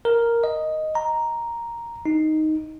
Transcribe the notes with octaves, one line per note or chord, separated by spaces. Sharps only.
A#4
D#5
A#5
D#4